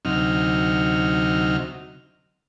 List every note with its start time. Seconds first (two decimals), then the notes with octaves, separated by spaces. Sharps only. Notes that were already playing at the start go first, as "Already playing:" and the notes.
0.05 D2 C3 F#3 D#4 F6